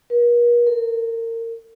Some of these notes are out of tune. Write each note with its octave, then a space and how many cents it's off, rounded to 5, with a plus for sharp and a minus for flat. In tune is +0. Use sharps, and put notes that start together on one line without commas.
A#4 +45
A#4 -30